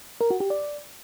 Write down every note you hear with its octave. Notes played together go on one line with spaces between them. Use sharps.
A#4
F#4
G4
D5